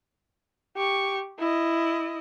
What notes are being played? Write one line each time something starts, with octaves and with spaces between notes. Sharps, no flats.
G4 C#6
E4 D#5